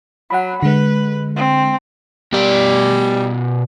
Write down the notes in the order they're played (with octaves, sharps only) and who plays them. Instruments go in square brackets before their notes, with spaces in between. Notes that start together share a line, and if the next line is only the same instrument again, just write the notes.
[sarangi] F#3 [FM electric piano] F#5 B5
[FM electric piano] D3 G#3 [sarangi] B4
[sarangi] C4
[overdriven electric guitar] B2 D5 [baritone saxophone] G3